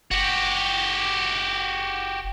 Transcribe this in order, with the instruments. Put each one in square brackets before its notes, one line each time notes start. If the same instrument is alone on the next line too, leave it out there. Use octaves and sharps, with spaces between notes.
[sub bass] F#1 [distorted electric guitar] F#4 G4